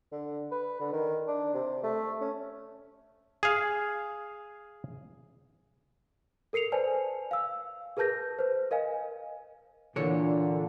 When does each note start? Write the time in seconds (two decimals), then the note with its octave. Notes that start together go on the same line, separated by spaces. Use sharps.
0.12 D3
0.51 B4
0.80 D3
0.92 D#3
1.27 D4
1.54 C3
1.83 A3
2.21 C#4
3.43 G#4 F5
6.53 A4 A#4 C7 C#7 F7
6.72 B4 C5 D5 G#5 A5
7.31 F5 E6
7.97 G#4 A#4 B4 A5 G6 A#6
8.39 B4 C5
8.71 A#4 D#5 F5 G#5
9.96 A#2 D3 E3 C#5